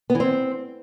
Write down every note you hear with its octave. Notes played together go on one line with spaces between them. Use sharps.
B3
E3
C4